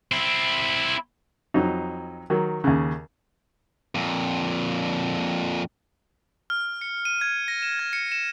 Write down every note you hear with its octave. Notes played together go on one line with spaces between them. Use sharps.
C4 E4
F2 F#3 D#4
D#3 F#3
D#2 C#3
F2 A#2
F6
C#7
D#7
G#6
A#6
E7
G#6
C#7
E7